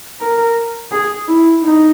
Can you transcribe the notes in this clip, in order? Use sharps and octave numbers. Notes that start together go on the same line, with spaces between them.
A#4
G#4
E4
D#4